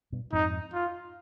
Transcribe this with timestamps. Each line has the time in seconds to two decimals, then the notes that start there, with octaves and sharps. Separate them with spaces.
0.12 G2 B2
0.33 F2 G#2 D#4
0.74 F4